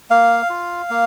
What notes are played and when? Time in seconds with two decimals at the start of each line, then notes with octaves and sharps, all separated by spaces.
0.10 A#3 F5
0.50 F4
0.90 A#3